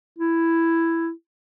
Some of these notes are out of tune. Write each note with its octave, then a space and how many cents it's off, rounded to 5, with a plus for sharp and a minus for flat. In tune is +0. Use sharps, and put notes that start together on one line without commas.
E4 +5